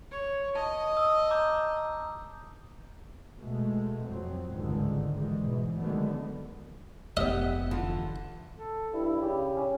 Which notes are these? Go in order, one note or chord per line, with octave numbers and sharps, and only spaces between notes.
C#5
D#5 A5
D#6 E6
A#5 D6 G6
B2 G#3 A3
F2 F#3 C4
G1 C#2 G#2 D3 D#3 G#3
G#2 E3 G3 G#3
G#2 B2 E3
D3 D#3 F#3 G#3 A3 B3
F1 B3 G4 D#5 E5
D3 E3 F4
A4
G2 E4
E4
C#3 G4
C#4